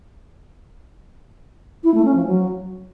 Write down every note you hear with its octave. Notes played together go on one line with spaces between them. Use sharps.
E4
A3
C#4
F3
F#3